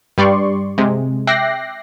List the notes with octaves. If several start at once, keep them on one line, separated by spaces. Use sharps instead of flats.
G2 G3 D5 C6 C#6
C3 G#3
E5 G5 D6 F#6 A#6 C7